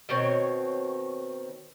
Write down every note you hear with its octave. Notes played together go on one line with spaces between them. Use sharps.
B2 D#3 C4 C#5